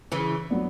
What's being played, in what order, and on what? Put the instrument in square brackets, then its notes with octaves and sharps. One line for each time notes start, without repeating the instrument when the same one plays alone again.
[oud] C#3 E3
[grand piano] F#3 B3 D4